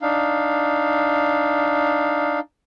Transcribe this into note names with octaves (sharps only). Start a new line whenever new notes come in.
D4 D#4 F5